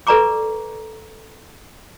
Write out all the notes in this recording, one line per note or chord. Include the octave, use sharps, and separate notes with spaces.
A4 B4 D5 A#5 C#6 D6